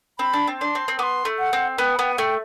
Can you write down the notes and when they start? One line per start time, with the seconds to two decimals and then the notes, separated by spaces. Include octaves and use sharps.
0.19 C4 B5
0.34 D4
0.47 C4
0.60 D4 C6
0.75 C4
0.88 C4
0.99 B3 D6
1.03 C6
1.25 A3
1.39 F#5
1.53 C4
1.78 B3 G5
1.96 B5
1.99 B3 G5
2.13 F#5
2.18 A3 G5